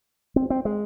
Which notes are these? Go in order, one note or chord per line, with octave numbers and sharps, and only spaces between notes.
C4
C4
G#3